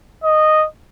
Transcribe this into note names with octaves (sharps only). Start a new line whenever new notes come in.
D#5